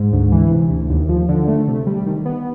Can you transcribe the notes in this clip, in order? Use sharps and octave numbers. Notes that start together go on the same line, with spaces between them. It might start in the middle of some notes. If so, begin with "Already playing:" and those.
Already playing: G#2
D2
E3
C3
D2
D#2
F3
D3
A3
C3
G3
D#3
B3